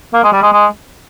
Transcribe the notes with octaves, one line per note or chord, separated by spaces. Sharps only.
A#3
G#3
G3
G#3
G#3